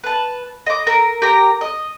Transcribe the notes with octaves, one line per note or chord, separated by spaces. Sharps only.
B4 A5
D#5 D6
A#4 E6
G4 A#4 A#5
D#5